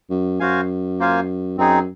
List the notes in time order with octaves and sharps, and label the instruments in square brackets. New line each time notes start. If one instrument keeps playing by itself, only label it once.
[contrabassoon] F#2
[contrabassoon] F#2 [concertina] F#4 C5 F5 G#5
[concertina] A#3 F4 C5 F5 G#5
[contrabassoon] F#2 [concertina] C4 D#4 G#4